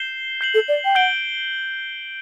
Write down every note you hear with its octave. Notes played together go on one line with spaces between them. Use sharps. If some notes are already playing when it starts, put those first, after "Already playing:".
Already playing: G6 C7 E7 G7
G6 C7 F#7
A4
D5
G5
F#5 G6 D7 G7